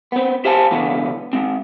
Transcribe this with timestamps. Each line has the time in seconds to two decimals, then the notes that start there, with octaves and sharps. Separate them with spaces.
0.12 B3 C4
0.45 G4 C5 F5 G#5 A5
0.71 C#2 B2 D3 E3 B3 F5
1.33 G#3 C4